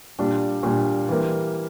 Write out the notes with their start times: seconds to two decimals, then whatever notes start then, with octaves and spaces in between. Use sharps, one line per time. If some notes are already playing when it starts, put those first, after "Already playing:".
0.19 A#2 G3 D4
0.63 A#2 G3 D4
1.09 E3 G3 A#3